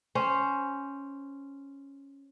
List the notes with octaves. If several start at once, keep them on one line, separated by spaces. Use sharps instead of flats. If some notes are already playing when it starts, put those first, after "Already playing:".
C#4 C5